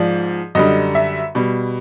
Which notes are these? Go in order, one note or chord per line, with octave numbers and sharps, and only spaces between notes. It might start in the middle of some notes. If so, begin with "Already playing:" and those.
Already playing: G#2 F3 D5
F#2 D3 G3 D#5
E5
B2 G3